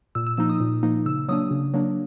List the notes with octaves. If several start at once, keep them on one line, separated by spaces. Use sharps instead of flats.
A#2 E6
E6
F3 A#3 D#4 E6
D#6
A#2
F3 A#3 D#4
C#3 E6
F#3 A#3 D4 D#6
C#3
F#3 A#3 D4